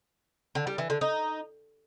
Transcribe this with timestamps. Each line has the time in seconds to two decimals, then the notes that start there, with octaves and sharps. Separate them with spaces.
0.55 D3
0.67 G3
0.78 E3
0.90 D3
1.01 D#4